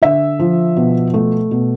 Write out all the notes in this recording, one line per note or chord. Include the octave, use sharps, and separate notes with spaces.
D3 E5
F3
B2
A3
B2